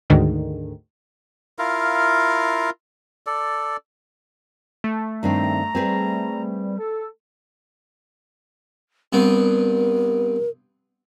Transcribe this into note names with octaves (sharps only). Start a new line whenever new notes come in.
D2 G#2 D3 D#3
E4 F4 A#4 F5
A4 D5
A3
G2 D#3 C4 A#5
G3 C4 G#4 B4
A4
G2 B3 C4 A#4